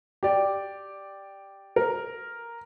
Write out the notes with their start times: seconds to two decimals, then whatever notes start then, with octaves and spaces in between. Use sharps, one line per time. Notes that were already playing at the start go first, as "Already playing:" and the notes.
0.23 G4 D5
1.76 A#4